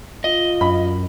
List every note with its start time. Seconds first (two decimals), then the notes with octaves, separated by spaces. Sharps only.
0.24 F4 D#5
0.61 F#2 B5